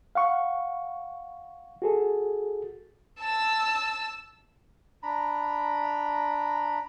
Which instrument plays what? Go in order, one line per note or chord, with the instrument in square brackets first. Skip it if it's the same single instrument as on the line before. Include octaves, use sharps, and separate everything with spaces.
[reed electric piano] F5 F#5 C#6
F#4 G#4 A4
[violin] A5 E6
[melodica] D4 A#5 B5